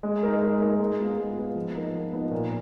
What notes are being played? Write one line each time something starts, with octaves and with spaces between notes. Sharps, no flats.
G#3
D#4 A#4
G#3
D#4 A#4
G#3
B3 F4 B4
G#3
B3 F4 B4
F3
B3 D#4 A#4
F3
B3 D#4 A#4
A#2